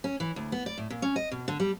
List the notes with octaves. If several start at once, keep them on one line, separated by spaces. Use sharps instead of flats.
C#4
E3
D2
B3
D5
A2
A#2
C#4
D#5
B2
D3
G3